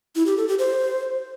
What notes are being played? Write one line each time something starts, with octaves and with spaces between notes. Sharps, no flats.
E4
G4
A4
G4
C5